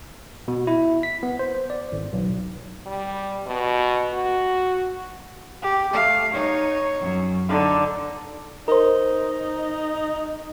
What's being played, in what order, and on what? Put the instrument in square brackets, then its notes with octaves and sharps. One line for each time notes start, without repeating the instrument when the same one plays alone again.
[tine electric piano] B2
E4
B6
B3
C5
D5
G#1
B1
[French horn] G3
B2
F#4
[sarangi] G4
[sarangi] A3 [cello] F5
[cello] D#4 [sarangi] C#5
[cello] F#2
[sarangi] D3 [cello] D#4
[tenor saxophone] D#4 [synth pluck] A#4 C5